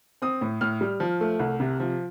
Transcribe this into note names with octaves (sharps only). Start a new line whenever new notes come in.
C4 D#6
A2
A2 F6
G3
F3
A3
C2
C3
F3